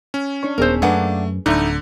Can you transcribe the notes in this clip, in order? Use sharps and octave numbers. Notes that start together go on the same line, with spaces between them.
C#4
D4 C#5 C#6
D#1 B3 D4 G#4 A#4 C5 E6
F#2 A3 A#3 D4 B4 F#5 G#5 D#6
D1 D3 G3 A3 D#4 D6